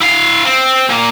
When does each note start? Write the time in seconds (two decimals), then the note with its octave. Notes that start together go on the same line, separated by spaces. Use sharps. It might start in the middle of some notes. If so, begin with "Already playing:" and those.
0.01 E4 F5
0.45 C4
0.89 A#2 A#3